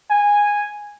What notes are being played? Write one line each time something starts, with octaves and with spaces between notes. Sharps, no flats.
G#5